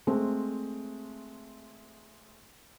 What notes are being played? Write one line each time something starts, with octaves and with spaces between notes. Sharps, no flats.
G#3 A3 C4